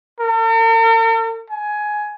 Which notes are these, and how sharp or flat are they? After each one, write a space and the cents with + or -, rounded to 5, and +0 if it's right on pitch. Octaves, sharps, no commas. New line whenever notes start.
A#4 -45
G#5 +15